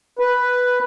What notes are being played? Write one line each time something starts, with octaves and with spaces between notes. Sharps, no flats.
B4